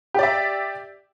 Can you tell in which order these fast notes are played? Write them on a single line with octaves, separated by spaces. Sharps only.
G4 D5 E5